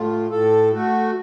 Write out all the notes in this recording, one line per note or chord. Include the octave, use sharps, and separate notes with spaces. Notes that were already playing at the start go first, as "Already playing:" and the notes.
Already playing: A2 F4
A2 A4
A3 F#4